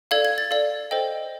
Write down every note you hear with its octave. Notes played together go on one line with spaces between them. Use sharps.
A4 D5 F5 G#6
G#6
A6
A4 D5 F5
A4 C5 D#5 G5